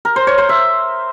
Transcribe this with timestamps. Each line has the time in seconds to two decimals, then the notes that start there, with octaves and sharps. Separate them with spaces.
0.05 A#4
0.16 C5
0.27 C#5
0.38 C5
0.49 E5